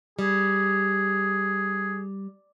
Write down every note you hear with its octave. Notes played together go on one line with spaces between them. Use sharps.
G3 G#4